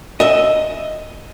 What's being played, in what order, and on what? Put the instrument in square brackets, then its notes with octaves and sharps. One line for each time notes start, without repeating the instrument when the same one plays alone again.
[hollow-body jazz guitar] D#5 E5